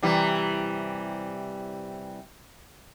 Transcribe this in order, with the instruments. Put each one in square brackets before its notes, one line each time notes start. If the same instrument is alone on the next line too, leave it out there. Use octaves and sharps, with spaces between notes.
[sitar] C3 E3 G3